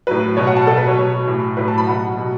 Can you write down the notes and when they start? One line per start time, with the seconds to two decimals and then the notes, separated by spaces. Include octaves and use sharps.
0.07 A2 F#3 B4
0.37 B2 F#3 C#5
0.47 F#5
0.56 A5
0.67 B2 A4
0.71 F#3
0.77 B4
0.88 C#5
0.97 B2 F#3
1.27 A2 E3
1.57 A2 F#3 B4
1.68 A5
1.78 B5
1.87 B2 F#3 F#5
2.17 B2 F#3